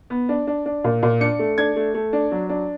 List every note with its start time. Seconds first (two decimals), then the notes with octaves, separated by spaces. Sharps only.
0.10 B3
0.29 D4
0.47 D4
0.66 D4
0.84 A#2
1.03 A#2
1.21 D4 C#7
1.39 A3
1.58 D4 G#6
1.76 A3
1.94 A3
2.13 D4
2.31 F#3
2.49 D4